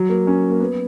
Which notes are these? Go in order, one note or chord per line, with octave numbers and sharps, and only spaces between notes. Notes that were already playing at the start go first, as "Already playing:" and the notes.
Already playing: F#3
A#3
C#4
A#3
B3